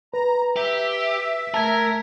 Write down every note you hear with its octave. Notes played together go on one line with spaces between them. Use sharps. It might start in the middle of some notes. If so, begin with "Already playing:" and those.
B4 A#5
G4 E5
A3 A#4 A5 G#6